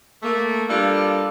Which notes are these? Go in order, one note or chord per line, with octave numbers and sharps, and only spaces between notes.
A3 A#3
G3 A#3 D4 F4 A4